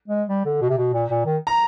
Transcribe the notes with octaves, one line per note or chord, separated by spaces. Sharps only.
G#3
G3
D3
B2
C3
B2
A#2
A#2
D#3
A#5